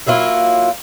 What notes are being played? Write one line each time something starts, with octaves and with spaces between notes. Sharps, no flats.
F#3 A#3 E4 F4